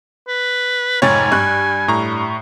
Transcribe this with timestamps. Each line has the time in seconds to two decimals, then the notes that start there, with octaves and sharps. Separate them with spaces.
0.28 B4
1.02 F1 G#2 C#5 G#5 A6
1.32 G2 C#6 F#6
1.88 A2 A#5 C#6